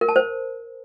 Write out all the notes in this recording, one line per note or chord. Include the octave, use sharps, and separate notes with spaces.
A#4
A5
C5